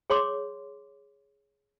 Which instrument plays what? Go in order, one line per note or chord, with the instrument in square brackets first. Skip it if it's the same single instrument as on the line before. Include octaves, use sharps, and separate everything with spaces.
[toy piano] G#4 C#5 C6 D6